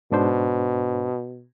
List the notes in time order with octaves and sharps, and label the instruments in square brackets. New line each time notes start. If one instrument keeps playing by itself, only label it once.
[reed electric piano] G#2 D4 C5 [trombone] B2